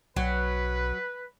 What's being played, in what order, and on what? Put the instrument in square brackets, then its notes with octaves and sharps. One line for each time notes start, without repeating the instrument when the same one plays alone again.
[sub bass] B1 [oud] F#3 [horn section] B4